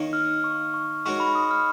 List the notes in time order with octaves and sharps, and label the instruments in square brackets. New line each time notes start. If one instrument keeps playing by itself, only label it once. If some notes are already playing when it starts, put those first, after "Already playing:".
Already playing: [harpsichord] D#3 A#3 D#4 A#4 C#5
[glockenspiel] F6
C#6
C#6
[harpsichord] G#3 D#4 F#4 A#4 C#5 [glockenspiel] C#6
[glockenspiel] B5
D#6
F6